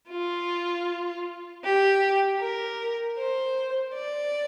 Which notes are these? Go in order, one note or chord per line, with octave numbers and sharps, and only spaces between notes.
F4
G4
A#4
C5
D5